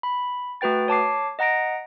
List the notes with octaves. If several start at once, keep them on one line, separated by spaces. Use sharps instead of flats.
B5
A3 F#4 B4 G5 A6
C#5 A5 D6 C7
D#5 F#5 A#5 A#6 D7